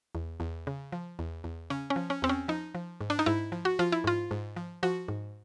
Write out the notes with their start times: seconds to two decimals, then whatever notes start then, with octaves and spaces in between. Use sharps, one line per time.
0.15 E2
0.40 E2
0.67 C#3
0.92 F3
1.19 E2
1.44 E2
1.70 C#3 C#4
1.90 C#4
1.96 F3
2.10 C#4
2.22 E2 C4
2.29 C#4
2.48 F3 D#4
2.75 F3
3.01 G#2
3.10 D4
3.19 D#4
3.26 G#2 E4
3.52 F3
3.65 F#4
3.79 F3 F4
3.92 E4
4.04 G#2 F4
4.31 G#2
4.56 F3
4.83 F3 F#4
5.08 G#2